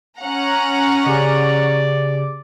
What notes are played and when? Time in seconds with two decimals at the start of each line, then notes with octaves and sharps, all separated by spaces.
0.20 C#4 F#5 A#5
1.06 C#3 G4 G#4 D5